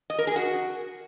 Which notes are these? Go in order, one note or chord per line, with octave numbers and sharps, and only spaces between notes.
D#5
A#4
G#4
F#4